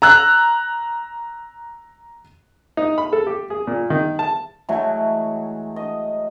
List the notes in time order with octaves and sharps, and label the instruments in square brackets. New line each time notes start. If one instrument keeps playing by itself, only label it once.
[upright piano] A#5 E6 F#6
[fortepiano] D#4
B5
A4
G4
G#4
A#2
D#3
A5
[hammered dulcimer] E3 F#3 G#3 A3
D#5